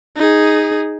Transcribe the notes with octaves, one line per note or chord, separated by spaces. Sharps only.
D#4 G#4